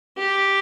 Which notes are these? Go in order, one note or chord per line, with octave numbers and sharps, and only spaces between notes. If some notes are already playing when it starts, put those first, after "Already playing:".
G4